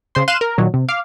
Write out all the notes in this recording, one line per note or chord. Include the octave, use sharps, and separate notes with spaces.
C#3 C5 C6
F5 C6 F#6 D#7 E7
A#4
A#2 D#3 F#3
C3
F5 D6